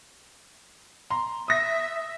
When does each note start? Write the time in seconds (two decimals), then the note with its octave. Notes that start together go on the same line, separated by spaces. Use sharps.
1.10 A#5 C6
1.48 E5 D#6 A#6